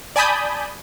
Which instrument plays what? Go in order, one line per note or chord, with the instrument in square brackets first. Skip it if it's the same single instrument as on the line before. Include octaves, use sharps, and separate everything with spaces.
[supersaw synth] D5 G#5 A5 B5 D#6 G6